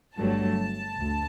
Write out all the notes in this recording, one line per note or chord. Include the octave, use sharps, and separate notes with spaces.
G1 G2 F#3 A3 A5
D2